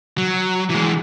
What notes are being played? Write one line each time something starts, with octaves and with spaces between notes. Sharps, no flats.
F#3
E3 G#3